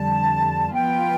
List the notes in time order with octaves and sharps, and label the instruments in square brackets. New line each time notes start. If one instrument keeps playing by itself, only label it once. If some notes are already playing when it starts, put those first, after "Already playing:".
Already playing: [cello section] F2 D3 G3 [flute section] A5
[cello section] F3 B3 F4 B4 [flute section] G5